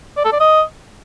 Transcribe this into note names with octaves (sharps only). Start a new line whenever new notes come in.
D5
A4
D5
D#5